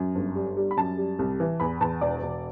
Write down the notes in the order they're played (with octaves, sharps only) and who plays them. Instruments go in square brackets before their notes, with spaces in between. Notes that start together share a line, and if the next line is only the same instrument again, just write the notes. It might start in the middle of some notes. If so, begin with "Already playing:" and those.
Already playing: [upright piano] F#2
G1
G3
G3
B5
F#2 A5
G3
C2
E3
E2 B5
E2 A5
E1 D5
E1